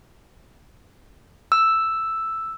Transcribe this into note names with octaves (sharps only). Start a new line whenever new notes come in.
E6